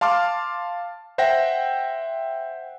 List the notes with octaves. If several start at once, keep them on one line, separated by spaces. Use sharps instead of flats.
F5 A5 C6 D6 F6
C5 E5 F#5 G5 A#6